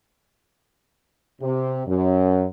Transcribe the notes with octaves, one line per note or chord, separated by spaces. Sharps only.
C3
F#2